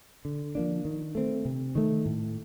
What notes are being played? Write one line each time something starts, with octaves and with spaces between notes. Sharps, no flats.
D3
F3 A#3 D4
D#3
A3 C4
C3
D#3 A3
A2